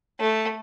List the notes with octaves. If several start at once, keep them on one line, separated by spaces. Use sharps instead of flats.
A3